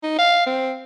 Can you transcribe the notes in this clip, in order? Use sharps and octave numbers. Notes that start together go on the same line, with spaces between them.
D#4
F5
C4